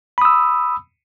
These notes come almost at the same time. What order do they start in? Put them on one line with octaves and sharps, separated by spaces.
B5 D#6 E6